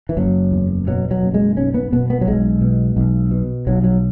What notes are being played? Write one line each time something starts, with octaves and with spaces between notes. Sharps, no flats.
E3
F#1 F#3
E2
B2 F#3
F#3
F#1
G#3
B1 C#4
B3
B2 B3
B3
F#3
B1 G#3
B2
B1
B2
B1 F#3
F#3